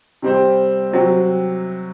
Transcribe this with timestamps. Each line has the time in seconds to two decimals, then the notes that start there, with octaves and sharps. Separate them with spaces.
0.22 C3 G3 C4 G4 C5
0.92 C3 F#3 C4